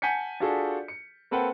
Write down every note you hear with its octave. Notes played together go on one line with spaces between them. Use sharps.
F#5 G#5 A5 G6 B6 C#7
D4 F4 F#4 G#4 A4
C#7
A#3 C4 A4 B4 F#5 G5